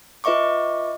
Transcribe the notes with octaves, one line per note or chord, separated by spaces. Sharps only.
F4 B4 D#5 E5 C#6 D6